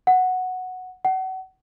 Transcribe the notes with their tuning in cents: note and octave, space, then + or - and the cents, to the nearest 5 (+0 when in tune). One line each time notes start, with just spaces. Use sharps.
F#5 -5
F#5 +35